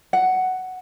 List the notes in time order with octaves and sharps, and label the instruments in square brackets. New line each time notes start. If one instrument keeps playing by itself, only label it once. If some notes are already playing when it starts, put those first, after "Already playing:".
[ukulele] F#5